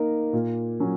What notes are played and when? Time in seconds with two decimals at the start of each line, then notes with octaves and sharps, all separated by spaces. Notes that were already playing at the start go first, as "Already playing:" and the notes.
Already playing: A#3 D#4 A#4
0.33 A#2
0.80 F#3 C#4